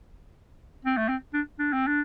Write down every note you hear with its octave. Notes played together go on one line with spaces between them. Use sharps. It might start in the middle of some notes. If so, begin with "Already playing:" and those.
C4
A3
C4
D4
D4
C4
D4